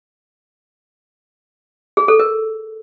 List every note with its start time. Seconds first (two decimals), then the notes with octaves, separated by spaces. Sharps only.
1.97 G#4
2.08 A4
2.19 A#4